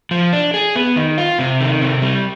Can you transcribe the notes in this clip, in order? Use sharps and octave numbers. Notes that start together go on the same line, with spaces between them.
F3
D4
G#4
B3
D#3
F4
C3
D#3
C3
G3